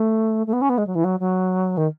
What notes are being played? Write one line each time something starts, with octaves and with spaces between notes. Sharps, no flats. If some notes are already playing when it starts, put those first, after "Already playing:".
Already playing: A3
A3
B3
C#4
B3
G#3
F#3
E3
F#3
F#3
D#3